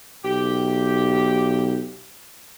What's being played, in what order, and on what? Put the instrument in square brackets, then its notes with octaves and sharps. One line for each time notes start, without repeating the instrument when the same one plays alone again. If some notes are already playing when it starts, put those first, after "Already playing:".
[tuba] B1 [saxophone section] G4